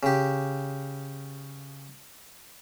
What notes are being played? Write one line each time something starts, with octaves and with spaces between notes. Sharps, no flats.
C#3 G4